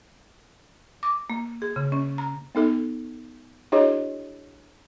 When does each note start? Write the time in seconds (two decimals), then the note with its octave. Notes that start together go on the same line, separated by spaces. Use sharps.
1.03 D6
1.30 A#3
1.62 G#4
1.76 C#3
1.92 C#4
2.18 A#5
2.55 B3 D#4 A4
3.72 D4 E4 F#4 G#4 C#5 D#5